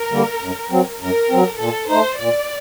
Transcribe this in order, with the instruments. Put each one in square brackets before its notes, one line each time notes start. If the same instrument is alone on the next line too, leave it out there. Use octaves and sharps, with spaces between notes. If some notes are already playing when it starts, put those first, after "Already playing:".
Already playing: [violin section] A#4
[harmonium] D3 G3 A#3
F#2
F#3 C4
[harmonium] F#2 [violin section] A#4
[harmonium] F#3 C4
[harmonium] A#2 [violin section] A4
[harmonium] A3 D#4 [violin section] C5
[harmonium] A#2 [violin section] D5